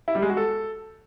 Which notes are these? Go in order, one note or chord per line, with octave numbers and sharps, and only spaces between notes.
E4
G3
G#3
F#4
A4